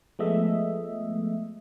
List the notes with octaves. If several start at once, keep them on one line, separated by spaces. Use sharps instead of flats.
F3 G#3 A3 B3 D#5 E5